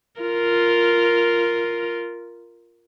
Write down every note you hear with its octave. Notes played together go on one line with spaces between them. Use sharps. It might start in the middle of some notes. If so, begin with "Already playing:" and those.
F4 A#4